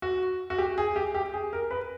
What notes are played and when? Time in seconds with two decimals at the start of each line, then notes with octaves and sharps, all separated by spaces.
0.02 F#4
0.50 F#4
0.58 G4
0.78 G#4
0.96 G4
1.15 G4
1.34 G#4
1.53 A#4
1.71 B4